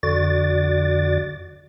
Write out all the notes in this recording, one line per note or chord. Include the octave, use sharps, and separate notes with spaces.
F2 D3 F#4 D5 A6